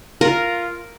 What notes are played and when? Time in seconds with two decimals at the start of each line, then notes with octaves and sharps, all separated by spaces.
0.21 F4 A#4